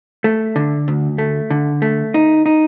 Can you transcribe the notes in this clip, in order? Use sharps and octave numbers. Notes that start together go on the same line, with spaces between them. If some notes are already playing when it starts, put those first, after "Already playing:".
A3
D3
D2
A3
D3
A3
D#4
D#4